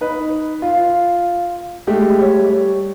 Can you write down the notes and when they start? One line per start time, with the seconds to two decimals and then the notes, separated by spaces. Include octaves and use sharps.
0.01 D#4 B4
0.62 F4
1.87 G#3 A3 G4
2.19 G3 C#5